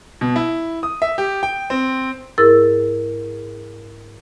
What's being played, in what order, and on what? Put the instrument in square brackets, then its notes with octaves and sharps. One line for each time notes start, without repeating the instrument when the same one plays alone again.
[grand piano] B2
E4
D#6
E5
G4
G5
C4
[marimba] G#2 E4 G#4 A#4 E6 A6